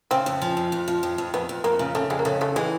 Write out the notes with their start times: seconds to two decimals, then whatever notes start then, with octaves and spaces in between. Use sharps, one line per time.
0.11 C#3 C4
0.26 F2
0.42 F3
0.57 F2
0.72 F2
0.88 F3
1.03 F2
1.18 F2
1.34 F2 B3
1.49 F2
1.64 F2 A#3
1.79 C#3
1.95 C#3 A3
2.10 F2 G#3
2.19 A#3
2.25 C#3 A3
2.41 F2 A3
2.56 E3 G#3